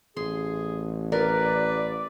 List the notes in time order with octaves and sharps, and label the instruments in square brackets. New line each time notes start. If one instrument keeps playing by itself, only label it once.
[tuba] A1 [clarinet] G#4 [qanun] C6
[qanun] A#4 [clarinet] B4 [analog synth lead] D5